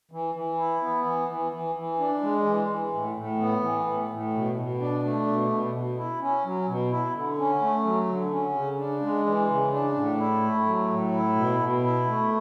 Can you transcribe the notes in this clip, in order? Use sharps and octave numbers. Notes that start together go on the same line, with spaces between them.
E3
E3
E4
B3
E3
E3
E3
E3
D4
G#3
E3
E3
A2
A2
B3
E3
A2
A2
B2
B2
D4
A3
B2
B2
B2
E4
C#4
F#3
B2
E4
D3
C#4
A3
F#3
D3
C#4
C#3
D4
G#3
E3
C#3
D4
A2
E4
A3
F#3
A2
E4
B2
B2
E4
A3